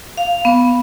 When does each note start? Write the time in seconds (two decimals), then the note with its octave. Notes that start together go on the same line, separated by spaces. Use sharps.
0.17 F5
0.45 B3